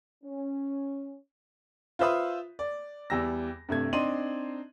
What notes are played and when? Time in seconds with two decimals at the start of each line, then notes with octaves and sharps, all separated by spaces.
0.24 C#4
1.99 F4 B4 C5 E5 B5 D#6
2.59 D5
3.10 E2 G3 E6 A#6
3.69 G2 C3 A3 G#6
3.93 C4 D4 D#4 C6 D#7 F#7